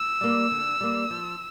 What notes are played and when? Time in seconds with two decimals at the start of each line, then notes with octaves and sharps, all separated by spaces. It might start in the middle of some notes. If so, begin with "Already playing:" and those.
Already playing: E6
0.21 G3 A#3
0.51 D3
0.81 G3 A#3
1.10 F3